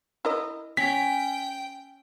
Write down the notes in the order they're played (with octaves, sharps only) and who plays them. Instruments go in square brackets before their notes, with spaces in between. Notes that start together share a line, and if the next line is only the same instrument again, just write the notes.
[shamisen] E4 A#4 D#5
[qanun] C#4 [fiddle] G5 [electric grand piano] B6